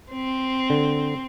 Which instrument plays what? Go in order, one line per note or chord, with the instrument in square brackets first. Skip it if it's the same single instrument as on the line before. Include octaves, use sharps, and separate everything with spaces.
[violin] C4
[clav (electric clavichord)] D3